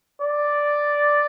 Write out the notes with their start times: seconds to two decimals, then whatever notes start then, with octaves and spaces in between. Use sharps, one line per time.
0.22 D5